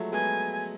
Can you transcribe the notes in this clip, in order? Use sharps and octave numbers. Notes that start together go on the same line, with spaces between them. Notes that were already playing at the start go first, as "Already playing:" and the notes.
Already playing: F3 F#3 G#3 A3
G#3 B3 G#5